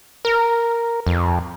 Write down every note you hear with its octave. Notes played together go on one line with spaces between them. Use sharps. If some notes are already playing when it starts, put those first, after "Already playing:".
A#4
F2